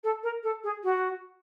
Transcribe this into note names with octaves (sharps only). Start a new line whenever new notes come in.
A4
A#4
A4
G#4
F#4